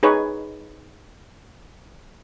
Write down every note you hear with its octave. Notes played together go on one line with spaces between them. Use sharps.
D#4 G#4 B4 C#5